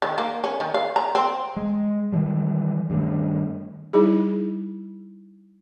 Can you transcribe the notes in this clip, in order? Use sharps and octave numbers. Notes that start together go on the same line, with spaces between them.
D#3
A#3
C#4
D#3
F5
A#5
C4
G#3
D#3 E3 G3
G2 D#3 A3
G3 D#4 E4 G#4